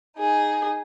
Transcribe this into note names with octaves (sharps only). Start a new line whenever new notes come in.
D#4 G#4